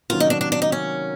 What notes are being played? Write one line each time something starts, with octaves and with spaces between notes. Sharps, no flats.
C3 D#3 F#3 A#3 C#4 F4
D#4
D4
D4
D4
D#4
C#4